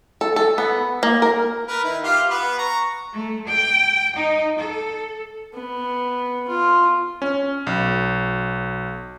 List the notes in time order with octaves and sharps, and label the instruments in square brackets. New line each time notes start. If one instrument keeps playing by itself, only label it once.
[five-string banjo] A4
A4
B3
A#3
A#4
[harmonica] A#4 B4
D#3 E4
F4 G4 F5
B3 B4
A#5 C#6
[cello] A3
G5
D#4
A4
[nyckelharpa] B3
F4
[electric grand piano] C#4
B1